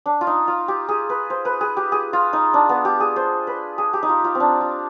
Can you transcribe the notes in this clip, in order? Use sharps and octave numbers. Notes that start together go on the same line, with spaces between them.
D4
F4
D#4
F4
G4
G#4
B4
C5
B4
G#4
G4
G#4
F4
D#4
D4
B3
G4
G#4
C5
B4
G#4
G4
D#4
F4
F4
C4
D4
F4